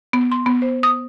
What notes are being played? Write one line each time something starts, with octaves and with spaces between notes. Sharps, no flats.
B3
C6
B3
C5
D#6